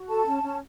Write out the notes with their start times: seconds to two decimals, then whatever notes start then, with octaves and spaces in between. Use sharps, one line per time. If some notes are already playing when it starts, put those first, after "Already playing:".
Already playing: F#4
0.09 A4 A5
0.26 C#4
0.43 C#4